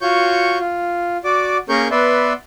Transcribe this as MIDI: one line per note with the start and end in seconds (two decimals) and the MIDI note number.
0.01 0.58 65
0.01 0.58 66
0.01 0.58 73
0.01 0.58 85
0.01 0.58 91
0.59 1.17 65
1.24 1.58 66
1.24 1.58 74
1.24 1.58 86
1.69 1.88 58
1.69 1.88 61
1.69 1.88 68
1.69 1.88 70
1.69 1.88 85
1.69 1.88 91
1.91 2.33 59
1.91 2.33 71
1.91 2.33 74
1.91 2.33 76
1.91 2.33 84